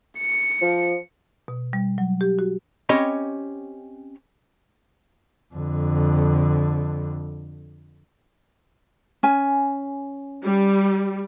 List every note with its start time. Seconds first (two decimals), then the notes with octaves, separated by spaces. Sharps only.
0.19 C#7
0.61 F3
1.48 B2
1.73 G3
1.98 F#3
2.21 G4
2.39 F#4
2.89 C4 C#4 G4 C#5 D#5 B5
5.54 F2 D3
9.23 C#4 G#5
10.44 G3